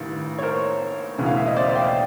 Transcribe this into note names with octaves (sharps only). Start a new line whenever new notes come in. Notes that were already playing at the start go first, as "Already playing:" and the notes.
Already playing: A1 G2 D#3
C#5
A#4 C5
E1 D2 C#3 E3
F5
E5
D#5
C5 D5
F5 G5